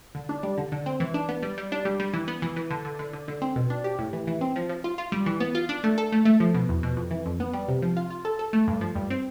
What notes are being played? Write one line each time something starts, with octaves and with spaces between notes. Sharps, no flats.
D3
D4
G3
D3
D3
C4
E3
D4
B3
G3
G3
D4
G3
G3
E3
B3
E3
E3
D3
D3
D3
D3
D3
C4
B2
D4
G4
A2
E3
E3
C4
F3
F3
F4
F4
G3
E3
B3
F4
D4
A3
A4
A3
A3
F3
B2
E2
B2
F2
E3
F2
B3
G3
C3
F3
F4
F4
A4
A4
A3
G2
F3
G2
C4